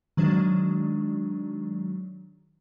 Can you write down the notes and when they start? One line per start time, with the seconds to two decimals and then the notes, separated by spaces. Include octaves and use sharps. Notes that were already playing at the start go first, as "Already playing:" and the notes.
0.17 D#3 F#3 G#3 D4